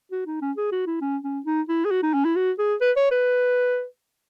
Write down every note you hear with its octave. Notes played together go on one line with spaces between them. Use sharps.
F#4
D#4
C#4
G#4
F#4
E4
C#4
C#4
D#4
E4
G#4
F#4
D#4
C#4
E4
F#4
G#4
B4
C#5
B4